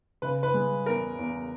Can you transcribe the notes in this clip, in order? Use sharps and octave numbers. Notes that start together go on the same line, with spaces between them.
C#3 B4
B4
G#3
E2 A#4
E2